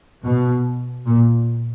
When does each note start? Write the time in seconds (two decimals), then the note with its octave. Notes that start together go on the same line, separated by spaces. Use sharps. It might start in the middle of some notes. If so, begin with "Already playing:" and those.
0.25 B2
1.06 A#2